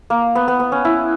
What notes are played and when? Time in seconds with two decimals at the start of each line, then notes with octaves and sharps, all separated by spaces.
0.10 A#3
0.35 B3
0.48 B3
0.60 B3
0.72 C#4
0.85 E4